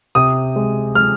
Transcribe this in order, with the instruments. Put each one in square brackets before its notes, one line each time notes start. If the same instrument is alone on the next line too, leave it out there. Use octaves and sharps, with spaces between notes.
[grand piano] C3 D#6
G#3
G#3 F6